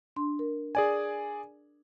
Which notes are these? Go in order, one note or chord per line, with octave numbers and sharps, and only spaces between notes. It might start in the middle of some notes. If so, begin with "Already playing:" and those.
D4 C6
A#4
G#4 D5 G#5